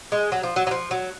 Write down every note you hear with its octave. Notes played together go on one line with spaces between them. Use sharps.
G#3
F#3
F3
F#3
F#3
F3
F#3